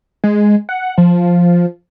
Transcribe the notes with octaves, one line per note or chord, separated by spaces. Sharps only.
G#3
F#5
F3